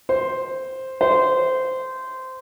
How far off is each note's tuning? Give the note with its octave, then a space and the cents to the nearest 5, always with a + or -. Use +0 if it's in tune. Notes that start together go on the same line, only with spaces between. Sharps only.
C5 +5
C5 -15